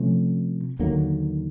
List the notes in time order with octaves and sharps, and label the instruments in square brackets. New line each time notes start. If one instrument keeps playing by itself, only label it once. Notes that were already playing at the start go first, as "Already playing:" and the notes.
Already playing: [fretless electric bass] C3 F3 A3 C#4
D#2 D3 F#3 A#3